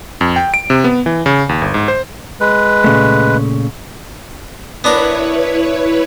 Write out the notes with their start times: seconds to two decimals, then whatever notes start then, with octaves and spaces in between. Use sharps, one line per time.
0.21 F2
0.36 G5
0.54 D7
0.70 C3
0.84 B3
1.06 E3
1.26 C#3
1.49 D#2
1.62 G1
1.74 G#2
1.88 C5
2.41 G#3 B4
2.84 A#2 C#3 A3
4.84 B3 D4 E4 A#4 B4 C#5